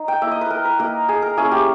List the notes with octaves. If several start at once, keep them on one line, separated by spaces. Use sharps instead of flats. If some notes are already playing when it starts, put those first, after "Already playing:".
Already playing: D#4
G5
A#3 E4 E5
D#5
B4
A#4
B4
A#3 D#4 A#4
G#4
A#4
A#3 C#4 E4 G#4
G4